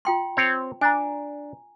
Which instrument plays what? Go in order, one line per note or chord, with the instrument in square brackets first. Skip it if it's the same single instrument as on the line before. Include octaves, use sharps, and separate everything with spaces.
[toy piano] F4 G5 C6
[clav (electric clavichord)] C4 C#5
[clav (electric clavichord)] D4 [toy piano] G#5 A#5